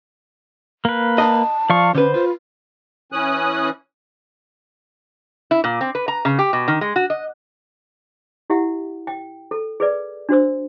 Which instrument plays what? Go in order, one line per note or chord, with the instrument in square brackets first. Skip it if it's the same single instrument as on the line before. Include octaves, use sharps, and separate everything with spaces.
[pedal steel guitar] A#3 B4
[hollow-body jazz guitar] D#5 [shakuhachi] A5
[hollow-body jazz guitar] F3 [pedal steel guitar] D5 F5 C#6
[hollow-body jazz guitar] D3 B4 [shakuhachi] C#4 [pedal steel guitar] C5
[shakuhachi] F4 [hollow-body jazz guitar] B4
[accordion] E3 C#4 G#5 D#6 F#6
[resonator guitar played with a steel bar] E4
A#2
C4
B4
A#5
C#3
G4
B2
D#3
G#3
F#4
D#5
[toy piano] E4 G4 E5 F#5
G5
A4
G#4 B4 D5
D4 F#4 C5 E6